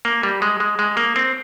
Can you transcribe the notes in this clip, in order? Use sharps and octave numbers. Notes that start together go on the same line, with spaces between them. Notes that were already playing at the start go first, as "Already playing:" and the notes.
A#3
G3
G#3
G#3
G#3
A#3
C4